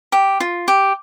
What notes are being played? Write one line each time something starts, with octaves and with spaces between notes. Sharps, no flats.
G4
F4
G4